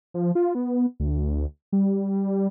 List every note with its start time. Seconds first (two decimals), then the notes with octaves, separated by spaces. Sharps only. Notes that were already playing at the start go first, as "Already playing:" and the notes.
0.14 F3
0.35 F4
0.55 B3
1.00 D2
1.73 G3